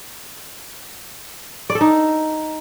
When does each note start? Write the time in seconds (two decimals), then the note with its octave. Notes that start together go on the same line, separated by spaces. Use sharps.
1.70 D5
1.75 A4
1.81 D#4